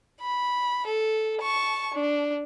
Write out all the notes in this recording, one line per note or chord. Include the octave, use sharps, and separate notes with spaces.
B5
A4
A5 C#6
D4